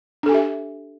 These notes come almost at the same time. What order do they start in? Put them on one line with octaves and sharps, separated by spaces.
D4 A4 G#5 G4 E5